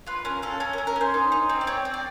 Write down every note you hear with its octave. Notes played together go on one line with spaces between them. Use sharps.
F4 B4
C#4 A#4
C#4 A4
C#4 A#4
A#4
C#4
A#4
C#4 C5
D#4
D#4
C4
D5
C4 C#5
C4
D5